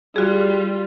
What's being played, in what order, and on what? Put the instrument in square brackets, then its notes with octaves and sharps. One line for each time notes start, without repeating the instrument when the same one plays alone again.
[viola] G3 F4 [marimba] F#4 G#4